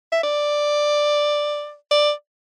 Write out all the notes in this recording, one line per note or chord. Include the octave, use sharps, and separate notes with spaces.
E5
D5
D5